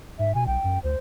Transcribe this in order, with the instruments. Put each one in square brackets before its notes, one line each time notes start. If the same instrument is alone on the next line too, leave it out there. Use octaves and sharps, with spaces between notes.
[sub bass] G#2 [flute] E5
[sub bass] B2 [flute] G#5
[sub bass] B1 [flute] G5
[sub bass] F#2
[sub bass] D2 [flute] C5